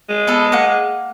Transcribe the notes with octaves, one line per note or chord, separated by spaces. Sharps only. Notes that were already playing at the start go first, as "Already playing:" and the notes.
G#3
B3 A4
A#3 F#5